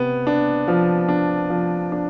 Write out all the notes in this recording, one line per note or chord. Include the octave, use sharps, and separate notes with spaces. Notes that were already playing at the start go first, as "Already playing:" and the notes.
Already playing: C3 B3
D4
F3
D4
F3
D4